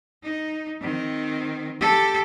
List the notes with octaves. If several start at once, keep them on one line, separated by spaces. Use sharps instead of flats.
D#4
D#3 C4
G4 A4